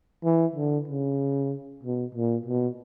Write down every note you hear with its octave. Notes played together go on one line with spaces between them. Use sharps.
E3
D3
C#3
B2
A#2
B2